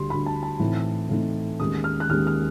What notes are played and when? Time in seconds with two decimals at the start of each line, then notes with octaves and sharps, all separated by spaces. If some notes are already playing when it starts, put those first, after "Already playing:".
Already playing: D2 D3 G3 C6
0.10 D2 D3 G3 B5
0.26 A5
0.43 A5
0.59 A2 E3 A3 C4 D#4
1.09 A2 E3 A3 C4 D#4
1.60 D#2 D#3 G#3 C#4 D#6
1.84 F6
2.00 F#6
2.09 D#2 D#3 G#3 C#4 F6
2.27 F6